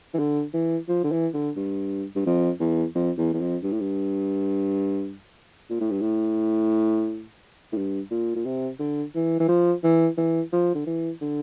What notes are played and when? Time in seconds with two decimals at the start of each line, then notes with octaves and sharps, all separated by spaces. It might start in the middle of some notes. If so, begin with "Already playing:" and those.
0.14 E3
0.19 D3
0.53 E3
0.88 F3
1.04 D3
1.12 E3
1.34 D3
1.56 G2
2.15 G2
2.26 F2
2.60 E2
2.95 F2
3.18 E2
3.33 E2
3.40 F2
3.63 G2
3.72 A2
3.80 G2
5.70 A#2
5.80 A2
5.90 G2
6.01 A2
7.72 A2
7.76 G2
8.11 A#2
8.35 A#2
8.45 C3
8.79 D3
9.15 E3
9.40 E3
9.48 F3
9.84 E3
10.17 E3
10.52 F3
10.75 D3
10.86 E3
11.21 D3